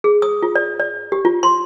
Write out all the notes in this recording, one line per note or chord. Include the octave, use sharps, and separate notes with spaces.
G#4
D#6
F4
D5
D5
G4
F4
C6